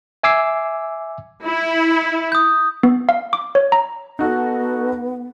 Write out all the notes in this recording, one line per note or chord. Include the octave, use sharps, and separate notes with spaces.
E5 G#5 D6 E6 C7
E4
D#6 G6
B3
F5
D6
C#5
A#5
B3 D#4 F#4 A4